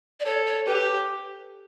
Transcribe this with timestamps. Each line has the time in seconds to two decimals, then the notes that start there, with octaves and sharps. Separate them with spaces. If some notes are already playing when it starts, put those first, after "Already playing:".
0.20 D5
0.25 A4 C#5
0.46 C#5
0.67 G4 B4